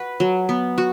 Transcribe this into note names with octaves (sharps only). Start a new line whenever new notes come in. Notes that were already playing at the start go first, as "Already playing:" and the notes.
Already playing: F#4 B4
F#3
B3
F#4